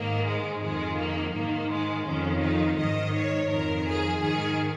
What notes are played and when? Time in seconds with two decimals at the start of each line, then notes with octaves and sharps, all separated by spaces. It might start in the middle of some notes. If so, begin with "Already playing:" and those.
Already playing: G#2 D#3 A#3
0.26 G#3
0.61 F2 D#3 G#3
0.97 A#3
1.34 G#2 D#3 A#3
1.70 G#3
2.06 F2 D#3 C#4
2.42 D#4
2.78 G#2 D#3 D#5
3.14 C#5
3.50 F2 D#3 A#4
3.86 G#4
4.22 G#2 D#3 G#4